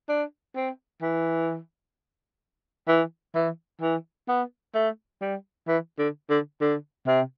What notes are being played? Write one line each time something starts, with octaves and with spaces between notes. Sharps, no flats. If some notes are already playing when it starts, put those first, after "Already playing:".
D4
C4
E3
E3
E3
E3
B3
A3
G3
E3
D3
D3
D3
C3